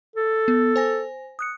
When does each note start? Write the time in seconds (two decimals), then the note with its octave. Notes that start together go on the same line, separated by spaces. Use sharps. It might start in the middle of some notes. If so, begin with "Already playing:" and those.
0.16 A4
0.48 B3
0.76 C5 G#5 A#6
1.39 D#6 F#6 C#7